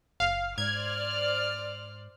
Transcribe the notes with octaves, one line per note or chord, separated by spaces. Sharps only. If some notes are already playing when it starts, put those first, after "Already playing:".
F#1 F5
G#2 C5 D5 F6 G#6